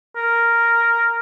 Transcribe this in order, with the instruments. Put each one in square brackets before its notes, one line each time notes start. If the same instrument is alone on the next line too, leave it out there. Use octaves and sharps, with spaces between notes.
[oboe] A#4